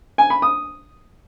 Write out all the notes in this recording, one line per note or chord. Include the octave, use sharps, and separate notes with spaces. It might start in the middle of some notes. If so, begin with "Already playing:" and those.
G#5
B5
D#6